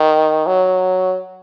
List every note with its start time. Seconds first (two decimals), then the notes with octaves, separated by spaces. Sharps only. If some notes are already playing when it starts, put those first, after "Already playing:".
Already playing: D#3
0.47 F#3